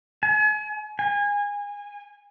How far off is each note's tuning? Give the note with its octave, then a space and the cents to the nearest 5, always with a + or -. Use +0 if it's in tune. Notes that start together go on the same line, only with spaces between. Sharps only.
G#5 +40
G#5 -25